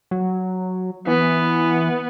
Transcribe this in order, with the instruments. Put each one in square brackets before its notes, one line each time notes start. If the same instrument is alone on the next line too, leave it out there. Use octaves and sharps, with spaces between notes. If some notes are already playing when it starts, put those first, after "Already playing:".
[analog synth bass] F#3
[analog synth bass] E3 [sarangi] B3